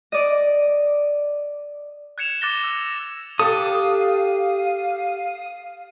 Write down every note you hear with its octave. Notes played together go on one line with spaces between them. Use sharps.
D5 D#5
F#6 G#6 C#7 E7 F7
D6 F#6 A6 A#6 G7
E6 A#6
D4 G4 A4 F5 D#6